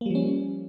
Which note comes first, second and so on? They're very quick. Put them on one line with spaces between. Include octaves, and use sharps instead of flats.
A#3 G3 F3 C#4